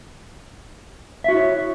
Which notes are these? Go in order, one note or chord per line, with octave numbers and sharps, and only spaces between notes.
E4 F#4 C#5 E5